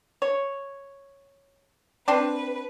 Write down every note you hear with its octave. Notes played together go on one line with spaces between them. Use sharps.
C#5
C4 D4 B4